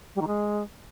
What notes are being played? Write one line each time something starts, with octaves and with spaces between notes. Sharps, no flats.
G3
D#3
G#3